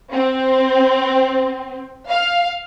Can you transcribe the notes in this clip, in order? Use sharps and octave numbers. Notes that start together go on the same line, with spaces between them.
C4
F5